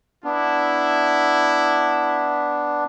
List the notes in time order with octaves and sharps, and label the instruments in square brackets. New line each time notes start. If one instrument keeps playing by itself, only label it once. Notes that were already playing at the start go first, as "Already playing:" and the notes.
[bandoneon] B3 D4 [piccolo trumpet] E4